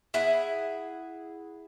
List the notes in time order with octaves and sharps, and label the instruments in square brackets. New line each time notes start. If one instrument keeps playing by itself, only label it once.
[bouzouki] E4 G#4 F#5